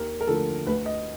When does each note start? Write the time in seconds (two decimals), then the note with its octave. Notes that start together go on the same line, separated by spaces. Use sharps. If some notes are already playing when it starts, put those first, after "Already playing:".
Already playing: D#2 A#4
0.21 A#4
0.27 D3 F3 A3 A4
0.66 D2 B4
0.86 D#5